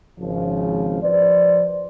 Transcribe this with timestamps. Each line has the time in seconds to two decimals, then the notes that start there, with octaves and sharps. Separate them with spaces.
0.18 G#1 C#3 F3
1.02 F3 B4 C5 D5